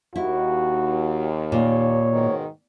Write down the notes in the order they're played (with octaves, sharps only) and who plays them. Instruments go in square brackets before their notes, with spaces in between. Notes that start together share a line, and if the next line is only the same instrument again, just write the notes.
[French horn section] D#2 [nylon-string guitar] E4 [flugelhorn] F#4
[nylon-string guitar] A#2 [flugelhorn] C#5
[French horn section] G#2 B2 D#3